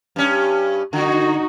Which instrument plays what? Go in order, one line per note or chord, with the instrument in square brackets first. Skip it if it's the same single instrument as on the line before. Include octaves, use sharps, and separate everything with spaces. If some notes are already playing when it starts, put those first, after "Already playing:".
[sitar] G2 C#4
[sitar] D3 [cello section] D#4 F#4